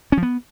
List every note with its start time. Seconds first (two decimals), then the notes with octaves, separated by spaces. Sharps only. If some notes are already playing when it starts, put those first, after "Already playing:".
0.12 C#4
0.17 F3
0.23 B3